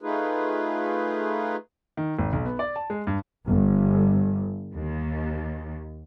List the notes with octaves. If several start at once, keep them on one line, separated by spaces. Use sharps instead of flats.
A3 D#4 F4 G#4 B4
D#3
G#1
B1
B3
D5
A5
G#3
G2
G1
D#2